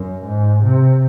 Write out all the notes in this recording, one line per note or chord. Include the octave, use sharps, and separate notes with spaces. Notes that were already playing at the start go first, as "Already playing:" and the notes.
Already playing: F#2
G#2
C3